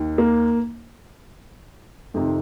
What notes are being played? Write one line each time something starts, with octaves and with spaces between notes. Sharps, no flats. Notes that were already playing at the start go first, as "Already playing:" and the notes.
Already playing: D#2 D#3
A#3
F2 C3 D#3